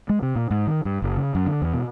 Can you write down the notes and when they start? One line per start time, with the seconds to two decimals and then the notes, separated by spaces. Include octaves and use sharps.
0.09 G#3
0.22 C3
0.36 A#2
0.51 G#2
0.67 D#3
0.85 G2
1.02 F#1
1.17 C#3
1.35 F#2
1.47 D3
1.62 E2
1.74 B2